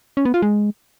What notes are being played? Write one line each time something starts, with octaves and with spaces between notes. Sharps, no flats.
C#4
B3
F4
G#3